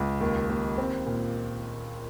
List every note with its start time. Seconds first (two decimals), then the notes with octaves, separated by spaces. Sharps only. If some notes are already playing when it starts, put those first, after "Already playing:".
Already playing: C#2
0.21 D#2
0.49 D#2
0.78 C4
1.06 A#2